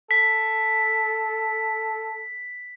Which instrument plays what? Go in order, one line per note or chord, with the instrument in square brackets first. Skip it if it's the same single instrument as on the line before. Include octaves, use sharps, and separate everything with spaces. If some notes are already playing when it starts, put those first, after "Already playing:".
[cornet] A4 [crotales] B6